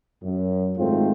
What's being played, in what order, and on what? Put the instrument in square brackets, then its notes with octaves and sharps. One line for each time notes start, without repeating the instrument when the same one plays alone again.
[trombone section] F#2
G#1 G#2 A3 C4 F4